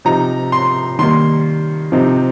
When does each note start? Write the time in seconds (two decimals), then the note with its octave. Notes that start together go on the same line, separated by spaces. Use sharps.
0.05 C3 F3 D#4 A#5
0.52 C6
0.99 D#3 G3 A#3 C6
1.92 C3 F3 C4 D#4